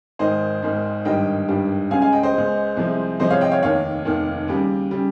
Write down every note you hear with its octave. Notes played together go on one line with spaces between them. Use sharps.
G#1 G#2 D#3 C5 D#5
G#1 G#2 D#3
G#1 G2 D#3 G3 D#5 G5
G#1 G2 D#3 G3
C#2 C#3 G#3 F5 G#5
F5 G#5
D#5 G5
C5 D#5
C#2 C#3 G#3
C2 C3 F3 G#3
C2 C3 F3 G#3 C5 D#5
C#5 F5
D#5 G5
C#5 F5
F1 D#2 D#3 C#5 F5
F1 D#2 D#3
D#2 C#3 G3
C#3 G3